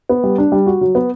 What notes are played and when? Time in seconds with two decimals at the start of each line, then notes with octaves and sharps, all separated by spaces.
0.09 B3
0.24 G3
0.38 D4
0.52 G3
0.66 F#4
0.81 F#3
0.95 B3